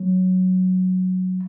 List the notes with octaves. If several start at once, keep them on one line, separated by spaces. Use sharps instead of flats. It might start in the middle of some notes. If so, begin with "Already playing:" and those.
Already playing: F#3